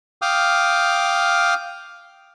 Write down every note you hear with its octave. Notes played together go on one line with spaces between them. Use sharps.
F5 G5 D6 D#6 F6